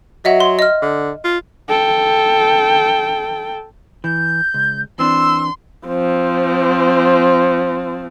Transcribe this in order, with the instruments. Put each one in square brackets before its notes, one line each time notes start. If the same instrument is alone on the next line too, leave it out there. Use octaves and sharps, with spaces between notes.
[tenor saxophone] F#3 [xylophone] D#5 E5 F#5
[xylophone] C6
D#5 F6
[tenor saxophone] D3
F4
[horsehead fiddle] A4 G5
[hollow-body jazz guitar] E3 [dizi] G6
[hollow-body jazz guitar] C#2
[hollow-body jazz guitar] E3 C4 D4 [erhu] C6 [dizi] E6
[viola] F3 C4